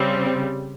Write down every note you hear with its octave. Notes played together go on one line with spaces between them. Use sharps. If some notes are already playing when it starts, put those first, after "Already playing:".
Already playing: C#3 G3 C4